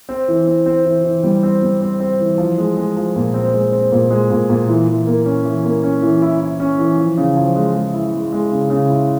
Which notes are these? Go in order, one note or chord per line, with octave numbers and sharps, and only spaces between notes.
C4
E3
C4
C4
E3
E3
G3
C4
G3
C4
C4
E3
F3
G#3
G#3
F3
A#2
C4
G#3
C4
A#2
G#3
A#2
A#2
E3
E3
A#3
C#4
E3
A#3
C#4
E3
E4
E4
C#4
E3
F3
C#3
F3
G#3
G#3
E4
G#3
G#3
C#3
C#3
E4